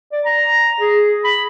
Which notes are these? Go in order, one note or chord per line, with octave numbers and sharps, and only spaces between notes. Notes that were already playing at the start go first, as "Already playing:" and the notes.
D5
A#5
G#4
B5